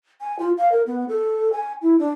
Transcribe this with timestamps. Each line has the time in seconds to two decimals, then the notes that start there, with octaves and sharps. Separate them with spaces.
0.21 G#5
0.39 F4
0.58 F5
0.72 A#4
0.87 B3
1.09 A4
1.53 G#5
1.82 E4
1.99 D4